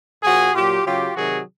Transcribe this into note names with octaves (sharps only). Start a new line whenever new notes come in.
A#2 F3 F#4 G#4
A#2 F#3 F4 G4
C#3 F#3 F4 G4
C3 D#3 F#3 F#4 G#4